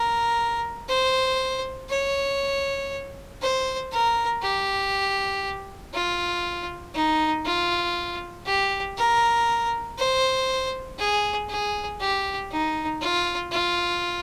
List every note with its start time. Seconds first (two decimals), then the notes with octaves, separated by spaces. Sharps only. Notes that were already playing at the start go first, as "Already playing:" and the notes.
Already playing: A#4
0.89 C5
1.89 C#5
3.42 C5
3.91 A#4
4.42 G4
5.94 F4
6.94 D#4
7.45 F4
8.46 G4
8.97 A#4
9.98 C5
10.99 G#4
11.49 G#4
12.00 G4
12.51 D#4
13.01 F4
13.51 F4